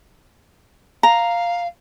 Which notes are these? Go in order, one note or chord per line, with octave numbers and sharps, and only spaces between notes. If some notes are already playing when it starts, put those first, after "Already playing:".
F5 A#5